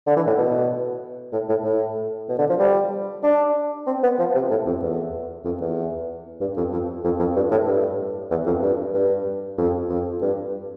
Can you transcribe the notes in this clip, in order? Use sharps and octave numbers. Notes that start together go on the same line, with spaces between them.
D3
E3
A2
B2
A2
A2
A2
B2
D3
F3
G3
D4
C4
B3
F3
C3
A2
F2
E2
F2
E2
G2
F2
F2
F2
F2
G2
A2
G2
E2
F2
G2
G2
F2
F2
G2